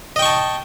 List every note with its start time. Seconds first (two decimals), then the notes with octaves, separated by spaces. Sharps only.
0.16 D#5
0.19 G5
0.22 C#6
0.25 A5